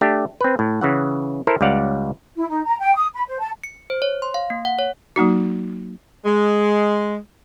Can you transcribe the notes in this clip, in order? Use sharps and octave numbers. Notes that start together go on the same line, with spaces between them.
A3 D4 G4
C4 B4
A2
C#3 E3 F#5
E4 A4 A#4 C5
C#2 G3 D5 F5 F#5
E4
D#4
A#5
G5
D#6
B5
C5
A5
C#7
C5
C#5
C6
F5
A#3
F#5
C#5
F#3 A#3 D#4 F#4
G#3